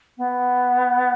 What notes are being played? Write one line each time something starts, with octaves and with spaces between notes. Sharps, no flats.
B3